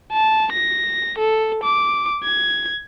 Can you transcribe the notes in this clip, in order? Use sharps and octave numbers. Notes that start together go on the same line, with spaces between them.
A5
A#6
A4
D6
G#6